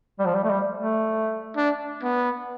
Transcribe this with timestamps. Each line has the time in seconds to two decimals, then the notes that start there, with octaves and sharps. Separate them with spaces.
0.19 G3
0.26 F3
0.34 G3
0.44 A3
0.50 G3
0.80 A3
1.57 D4
2.03 B3